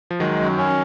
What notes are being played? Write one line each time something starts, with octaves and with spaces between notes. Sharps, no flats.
F3
D#3 F#3 G#3
F#2
C#4